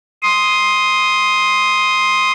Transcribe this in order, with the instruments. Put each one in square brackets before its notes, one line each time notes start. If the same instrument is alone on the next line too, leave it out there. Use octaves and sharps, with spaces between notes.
[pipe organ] C6 D#6